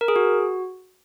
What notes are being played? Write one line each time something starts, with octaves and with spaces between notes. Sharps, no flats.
A#4
G#4
F#4